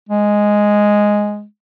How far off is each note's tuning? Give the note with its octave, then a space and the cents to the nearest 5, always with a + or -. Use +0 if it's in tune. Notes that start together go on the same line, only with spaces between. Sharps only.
G#3 +0